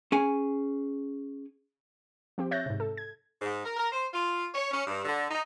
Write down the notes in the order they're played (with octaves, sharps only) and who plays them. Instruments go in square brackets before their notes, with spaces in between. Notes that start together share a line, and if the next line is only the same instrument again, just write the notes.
[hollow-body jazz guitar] C#4 G#4 G#5
[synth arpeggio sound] F3 C4 G4
C#5 E5 F#6 G6 A6 A#6
G#2 C3
A4
G#6
[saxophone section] G#2
A#4
A#4
C5
F4
C#5
C#4
G2
D3
D#4